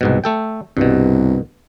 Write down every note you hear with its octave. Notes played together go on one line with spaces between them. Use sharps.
C2 G#2 B2
A3 A4 G5
C2 G2 B2